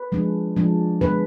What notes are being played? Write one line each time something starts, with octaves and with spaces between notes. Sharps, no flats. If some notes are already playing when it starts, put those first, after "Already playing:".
Already playing: B4
F3 G#3 D4
F3 G#3 D4
D3 G#3 B3 D4 B4